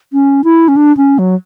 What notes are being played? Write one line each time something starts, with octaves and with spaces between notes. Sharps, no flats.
C#4
E4
C#4
D4
C#4
F#3